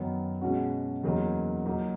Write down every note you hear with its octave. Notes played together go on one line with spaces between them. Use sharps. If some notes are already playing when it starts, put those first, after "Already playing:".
Already playing: F#2 D#3 F#3 B3
B2 G#3 C#4 F#4
E2 C#3 F#3 A#3 D#4
A#2 F#3 A#3 D#4 F#4